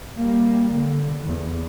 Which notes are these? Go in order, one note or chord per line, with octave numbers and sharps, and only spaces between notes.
G3 A#3
D3
E2